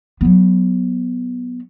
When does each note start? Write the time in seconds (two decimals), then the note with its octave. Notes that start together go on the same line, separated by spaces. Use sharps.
0.21 F#3 B3